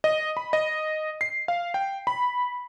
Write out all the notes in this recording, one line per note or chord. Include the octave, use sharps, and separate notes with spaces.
D#5
B5
D#5
C7
F5
G5
B5